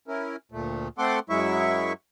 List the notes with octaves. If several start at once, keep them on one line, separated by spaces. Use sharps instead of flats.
C#4 E4 A#4
D2 A#2 A3
A3 C4 A4 F#5 C6 D6
F#2 F#3 G#3 E4 E5 C#6